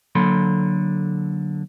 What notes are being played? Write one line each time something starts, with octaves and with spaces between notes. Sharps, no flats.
D3 F#3 A#3 A4 B5 C6